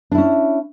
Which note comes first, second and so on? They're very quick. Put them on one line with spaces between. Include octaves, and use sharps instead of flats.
D4 E4 C#4